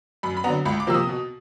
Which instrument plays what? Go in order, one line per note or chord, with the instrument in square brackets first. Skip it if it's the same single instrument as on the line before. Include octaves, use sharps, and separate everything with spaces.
[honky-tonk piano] F#2 B5
B5
D3 F#3 B3 A#5
C#2 B5
D6
C3 F3 A#3 E6
D#6
B2